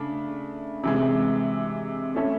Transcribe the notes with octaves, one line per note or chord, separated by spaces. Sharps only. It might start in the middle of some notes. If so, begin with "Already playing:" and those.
Already playing: C#3 A3 D4
C3 E3 G#3
A3 C#4 E4 A4